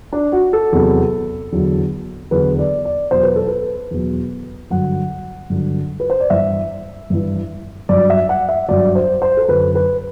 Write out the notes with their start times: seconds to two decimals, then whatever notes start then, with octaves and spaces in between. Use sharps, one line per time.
0.13 D4
0.32 F#4
0.53 A4
0.72 E2 C3 F#3
1.52 E2 D3 F#3
2.31 E2 D3 F#3 B4
2.59 D5
2.85 D5
3.11 E2 B2 F#3 C5
3.23 B4
3.36 A4
3.47 B4
3.91 E2 B2 F#3
4.70 G2 D3 F#3 F#5
5.50 G2 D3 F#3
6.00 B4
6.10 C5
6.20 D5
6.30 G2 E3 E5
7.10 G2 E3
7.89 G2 F#3 D5
8.10 E5
8.29 F#5
8.49 E5
8.68 G2 F#3 D5
8.95 C5
9.22 C5
9.37 A4
9.48 F#2 D3 F#3 B4
9.75 B4